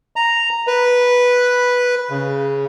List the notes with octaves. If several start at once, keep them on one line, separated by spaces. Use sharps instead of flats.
A#5
B4
C#3